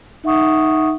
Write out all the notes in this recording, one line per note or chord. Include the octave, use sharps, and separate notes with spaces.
D#4 E5 F#5 C#6 D#6